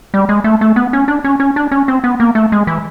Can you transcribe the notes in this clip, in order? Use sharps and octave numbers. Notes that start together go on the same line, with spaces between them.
G3
G#3
A3
A3
B3
C#4
D4
C#4
C#4
D4
C#4
C4
B3
A#3
A3
G#3
E3